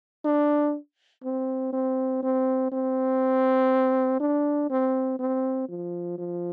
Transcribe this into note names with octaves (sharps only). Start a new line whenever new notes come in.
D4
C4
C4
C4
C4
D4
C4
C4
F3
F3